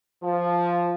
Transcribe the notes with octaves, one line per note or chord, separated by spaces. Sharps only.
F3